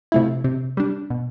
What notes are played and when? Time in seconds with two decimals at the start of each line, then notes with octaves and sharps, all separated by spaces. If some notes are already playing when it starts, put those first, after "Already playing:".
0.12 C3 F3 A3 E4
0.44 C3
0.77 G3 D4
1.10 B2